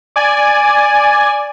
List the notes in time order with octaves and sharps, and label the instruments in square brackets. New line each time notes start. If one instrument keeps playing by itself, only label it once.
[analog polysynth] D5 G#5